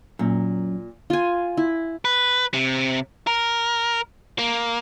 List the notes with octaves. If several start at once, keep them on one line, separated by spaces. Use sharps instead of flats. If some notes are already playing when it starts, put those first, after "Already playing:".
F#2 A#2
F4 G#5
E4
B4
C3
A#4
A#3